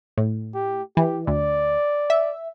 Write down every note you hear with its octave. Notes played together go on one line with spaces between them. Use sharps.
A2
G4
E3 G4
D2 D5
E5